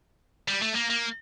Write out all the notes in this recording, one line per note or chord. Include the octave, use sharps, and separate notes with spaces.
G3
A3
A#3
A#3